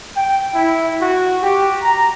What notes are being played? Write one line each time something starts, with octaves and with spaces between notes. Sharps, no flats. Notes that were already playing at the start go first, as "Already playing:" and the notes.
G5
E4
F#4
G4
A#5